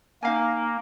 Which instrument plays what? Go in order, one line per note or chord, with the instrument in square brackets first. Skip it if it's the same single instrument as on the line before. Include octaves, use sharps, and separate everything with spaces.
[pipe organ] A#3 [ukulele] D#4 F5 G#5